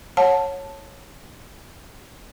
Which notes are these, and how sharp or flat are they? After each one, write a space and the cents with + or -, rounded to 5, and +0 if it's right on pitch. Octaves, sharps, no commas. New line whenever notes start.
C#5 -10 F#5 -20 A5 +0